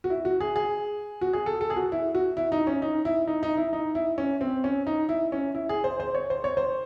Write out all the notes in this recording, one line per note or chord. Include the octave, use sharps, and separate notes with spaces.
F#4
E4
F#4
G#4
G#4
F#4
G#4
A4
A4
G#4
F#4
E4
F#4
E4
D#4
C#4
D#4
E4
D#4
D#4
E4
D#4
E4
C#4
C4
C#4
D#4
E4
C#4
E4
G#4
C5
C5
C#5
C5
C#5
C5